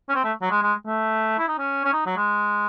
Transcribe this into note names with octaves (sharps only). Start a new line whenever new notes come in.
C#4
C4
A3
F#3
G#3
G#3
A3
E4
D#4
C#4
C#4
D#4
F#3
G#3